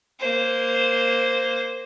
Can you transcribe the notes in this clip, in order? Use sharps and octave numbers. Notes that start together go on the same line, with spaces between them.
A#3 C5